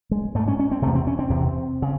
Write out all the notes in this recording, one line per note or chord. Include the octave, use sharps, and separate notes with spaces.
G#3
G#2 A3
C#4
C#4
C4
E2 C3 A3
C4
C#4
C4
E2 C3
C#3